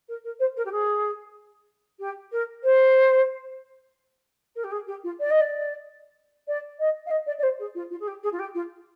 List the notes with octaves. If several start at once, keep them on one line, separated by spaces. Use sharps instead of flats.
A#4
A#4
C5
A#4
G4
G#4
G4
A#4
C5
A#4
G4
G#4
G4
F4
D5
D#5
D5
D5
D#5
F5
D#5
D5
D5
C5
G#4
F4
F4
G#4
G4
G#4
F4
G4
F4